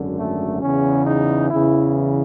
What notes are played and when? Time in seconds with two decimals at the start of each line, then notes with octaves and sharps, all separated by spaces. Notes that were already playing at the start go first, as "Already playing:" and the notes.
Already playing: G#1 F#2 D3
0.17 A3
0.62 E2 C#3 E3 C#4
1.06 D#4
1.50 E2 C#3 E3 E4